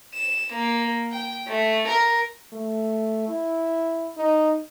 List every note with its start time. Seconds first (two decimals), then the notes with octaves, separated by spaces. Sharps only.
0.15 E7
0.53 A#3
1.12 G5
1.48 A3
1.88 A#4
2.53 A3
3.28 E4
4.17 D#4